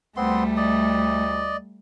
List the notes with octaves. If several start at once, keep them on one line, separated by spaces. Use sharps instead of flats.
D2 G3 A3 B3 C4 C6
D5 D#5